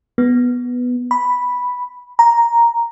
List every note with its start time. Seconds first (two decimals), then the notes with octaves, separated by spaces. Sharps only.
0.18 B3
1.11 B5
2.19 A#5